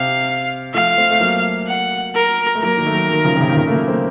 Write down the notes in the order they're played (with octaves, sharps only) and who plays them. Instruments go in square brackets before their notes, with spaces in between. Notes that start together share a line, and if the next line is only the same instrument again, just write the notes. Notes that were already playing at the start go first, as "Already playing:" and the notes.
Already playing: [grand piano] C3 [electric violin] F5
[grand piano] F3 A3 [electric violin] F5
[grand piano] A3 C4
A3
F#3 A#3
[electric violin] F#5
A#4
[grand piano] A3
[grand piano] F#3 A#3 [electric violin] A#4
[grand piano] D#3 F#3
A3
D#3 F#3
D#3 F#3
C#3 F3
C3
A#2 C#3
D#3
A#2 C#3
A3
F#3 A#3
A3 C4